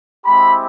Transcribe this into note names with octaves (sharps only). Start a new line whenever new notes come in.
G#3 C4 E4 G4 B5